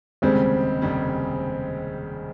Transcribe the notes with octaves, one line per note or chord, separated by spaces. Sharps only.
F1 D#2 C#3 G3 G#3 C4
F1 D#2 C#3 G3